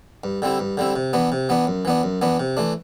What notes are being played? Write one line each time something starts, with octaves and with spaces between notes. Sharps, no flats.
G2
D3 G3 C4 E4
G2
D3 G3 C4 E4
C3
E3 B3 D4
C3
E3 B3 D4
F#2
E3 B3 D4
F#2
E3 B3 D4
C3
E3 A3 D4